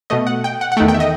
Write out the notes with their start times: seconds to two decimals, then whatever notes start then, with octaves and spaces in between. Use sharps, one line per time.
0.10 B2 A3 D#5
0.27 F#5
0.44 G5
0.61 F#5
0.72 F#5
0.77 E2 D#3 A3 G5
0.88 G5
0.94 E5
1.00 D#5